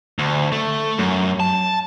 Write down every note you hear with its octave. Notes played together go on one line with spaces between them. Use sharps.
D2
A3
F#2
A5